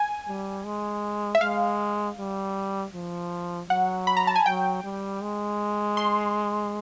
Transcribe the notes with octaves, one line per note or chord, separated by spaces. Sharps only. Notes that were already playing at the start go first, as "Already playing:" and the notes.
Already playing: G#5
G3
G#3
E5
G#3 F5
G3
F3
F#3 F#5
B5
A#5
A5
G#5
F#3 G5
G3
G#3
C6